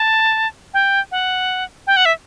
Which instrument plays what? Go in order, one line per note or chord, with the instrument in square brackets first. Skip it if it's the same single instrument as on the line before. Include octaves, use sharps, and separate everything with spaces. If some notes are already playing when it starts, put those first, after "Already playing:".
Already playing: [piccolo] A5
G5
F#5
G5
F#5
E5